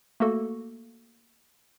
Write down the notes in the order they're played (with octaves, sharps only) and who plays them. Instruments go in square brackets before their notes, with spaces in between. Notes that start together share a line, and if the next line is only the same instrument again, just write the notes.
[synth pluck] A3 A#3 F#4 A4